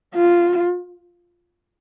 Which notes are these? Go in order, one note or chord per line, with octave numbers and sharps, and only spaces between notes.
F4